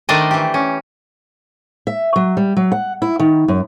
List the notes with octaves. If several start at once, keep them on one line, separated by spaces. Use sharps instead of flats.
D#3 A3 D4 C5 D5 D#5
E3 G4
C#4
E5
F#3
G3
F#3
F#5
E4
D#3
F#2